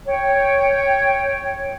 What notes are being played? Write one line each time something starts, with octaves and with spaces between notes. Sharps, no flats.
C#5 G5